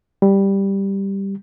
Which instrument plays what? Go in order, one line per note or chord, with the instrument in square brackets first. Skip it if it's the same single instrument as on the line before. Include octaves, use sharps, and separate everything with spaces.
[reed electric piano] G3